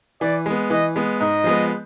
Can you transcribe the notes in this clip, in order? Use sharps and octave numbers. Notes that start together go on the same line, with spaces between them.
E3 D5
G#3 B3
E3 D#5
G#3 B3
G#2 D#5
F3 G#3 B3